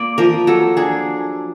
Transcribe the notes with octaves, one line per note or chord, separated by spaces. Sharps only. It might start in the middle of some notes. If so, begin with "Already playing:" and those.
Already playing: A#3 D5
F3 A#4
F#3 A4
D4 G#4